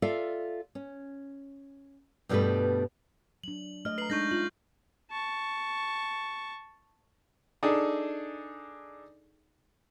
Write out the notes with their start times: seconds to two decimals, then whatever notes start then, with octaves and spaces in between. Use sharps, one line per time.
0.02 F4 A4 D5 E5 F5
0.75 C#4
2.29 G2 B2 G3 A3 A4 B4
3.44 F#3 D4 F#7
3.85 A3 D#5 F6
3.98 B4 A#5 C7 F#7
4.10 G#3 A3 D4 D#4 C#6 G6 A#6
4.31 C#4 F4 F#7
5.11 A5 C#6
7.63 D4 D#4 G#4 A4